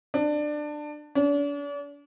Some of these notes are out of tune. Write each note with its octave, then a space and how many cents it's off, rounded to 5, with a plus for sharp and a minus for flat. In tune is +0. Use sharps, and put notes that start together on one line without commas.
D4 +20
D4 -40